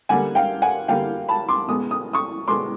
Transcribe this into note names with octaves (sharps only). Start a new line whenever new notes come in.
D3 G3 A#3 F#5 G#5
F5 G5
F#5 G#5
D3 G3 A#3 F5 G5
A5 B5
C6 D6
B2 G#3 B3 D#6
D#6
C#6 D#6
B2 G#3 B3 C6 D6